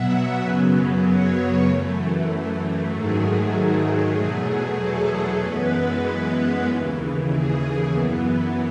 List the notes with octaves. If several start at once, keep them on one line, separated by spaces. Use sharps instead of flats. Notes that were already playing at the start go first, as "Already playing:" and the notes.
Already playing: B2 F#3 B3 E5 F#5
F#2 C#3 F#3 B3 G#5
C#5
F#2 E3 A3
G#2 D#3 F#3 A3 G#4
E2 B2 F#3 A3 G#4
A4
F#2 E3 G#3 B3 B4
B4
D#2 C#3 E3
G#4
F#2 E3 B3